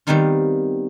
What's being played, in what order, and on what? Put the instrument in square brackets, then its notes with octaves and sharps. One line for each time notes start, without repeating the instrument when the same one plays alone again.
[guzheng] D#3 G3 B3 C4 D#4 F4